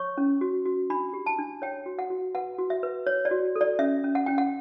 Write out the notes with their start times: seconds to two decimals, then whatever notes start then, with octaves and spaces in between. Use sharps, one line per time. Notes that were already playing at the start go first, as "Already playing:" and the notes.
Already playing: C#5 C#6
0.18 C#4
0.41 F#4
0.65 F#4
0.90 D4 B5
1.13 G4
1.26 A5
1.39 D4
1.62 C#5 G5
1.86 F#4
1.99 F#5
2.10 F#4
2.35 B4 F#5
2.58 F#4
2.70 E5
2.83 B4
3.07 C#5
3.25 D5
3.31 F#4
3.56 A4
3.61 D5
3.79 C#4 E5
4.04 C#4
4.15 F#5
4.26 C#4 G5
4.38 F#5